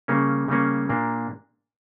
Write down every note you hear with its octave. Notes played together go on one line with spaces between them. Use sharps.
C#3 G3 A#3 C#4
C#3 G3 A#3 C#4
A#2 A#3 D4